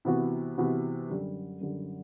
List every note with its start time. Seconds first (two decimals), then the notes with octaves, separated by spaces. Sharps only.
0.05 C3 E3 B3 F#4
0.58 C3 E3 B3 F#4
1.10 F#2 D3 G3
1.61 F#2 D3 G3